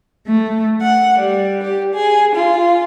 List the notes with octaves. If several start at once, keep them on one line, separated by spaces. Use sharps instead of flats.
A3
F#5
G3
G4
G#4
F4